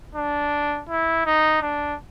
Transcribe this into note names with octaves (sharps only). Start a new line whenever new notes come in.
D4
E4
D#4
D4